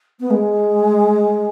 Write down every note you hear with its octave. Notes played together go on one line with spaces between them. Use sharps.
B3
G#3